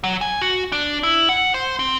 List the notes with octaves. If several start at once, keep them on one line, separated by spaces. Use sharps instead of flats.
F#3
G#5
F#4
D4
E4
F#5
C5
C4